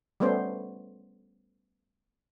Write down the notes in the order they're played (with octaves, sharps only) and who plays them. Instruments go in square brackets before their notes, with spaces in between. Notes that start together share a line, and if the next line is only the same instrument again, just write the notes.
[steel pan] G3 A3 B3 C#4 C5